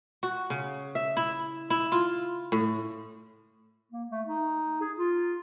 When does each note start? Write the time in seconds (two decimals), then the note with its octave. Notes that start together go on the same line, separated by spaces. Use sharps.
0.23 F#4
0.50 C#3
0.95 E5
1.17 E4
1.70 E4
1.92 F4
2.52 A2
3.92 A#3
4.11 A3
4.27 D#4
4.81 G#4
4.98 F4